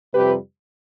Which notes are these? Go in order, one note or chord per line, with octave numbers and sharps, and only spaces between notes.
F2 C3 G3 G4 B4